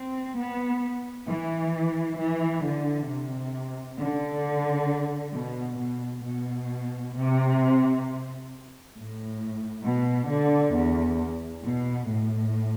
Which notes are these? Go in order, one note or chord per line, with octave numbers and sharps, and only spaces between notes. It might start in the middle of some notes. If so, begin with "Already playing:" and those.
Already playing: C4
B3
E3
E3
D3
C3
D3
B2
B2
B2
C3
A2
B2
D3
E2
B2
A2